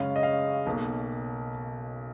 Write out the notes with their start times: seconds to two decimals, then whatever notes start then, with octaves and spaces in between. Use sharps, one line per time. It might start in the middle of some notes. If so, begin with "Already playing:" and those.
Already playing: F#2 C#3 G#3 C#4 F5
0.16 D#5
0.23 F5
0.66 B1 B2 A#3